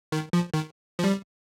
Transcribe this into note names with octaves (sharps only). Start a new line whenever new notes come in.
D#3
F3
D#3
F3
G3